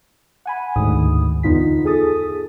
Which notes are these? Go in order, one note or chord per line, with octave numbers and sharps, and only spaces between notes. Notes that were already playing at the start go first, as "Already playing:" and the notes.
F#5 G#5 B5
D2 G#2 D#3 D#6
E2 D3 B3 D#4 F4 B6
G#4 A4 D#6 A6